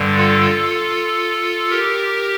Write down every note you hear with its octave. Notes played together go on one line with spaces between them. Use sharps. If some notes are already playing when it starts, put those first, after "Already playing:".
Already playing: G2 D3 G3
F4 A4
G4 A#4